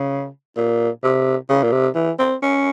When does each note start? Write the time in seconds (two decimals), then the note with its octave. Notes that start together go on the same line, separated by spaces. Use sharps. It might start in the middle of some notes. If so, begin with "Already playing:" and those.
Already playing: C#3
0.57 A#2
1.03 C3
1.49 C#3
1.63 A#2
1.72 C3
1.95 E3
2.19 C4
2.43 C#4